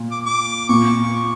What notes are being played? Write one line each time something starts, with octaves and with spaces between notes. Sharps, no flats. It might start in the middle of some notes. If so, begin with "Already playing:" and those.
Already playing: A#2
D6
D6
A#2 C#6